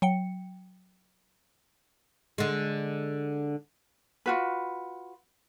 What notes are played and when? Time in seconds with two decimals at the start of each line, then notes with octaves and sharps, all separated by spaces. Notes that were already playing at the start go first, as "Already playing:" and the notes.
0.02 F#3 G5 C#7
2.38 D3 G#3
4.26 F4 F#4 B4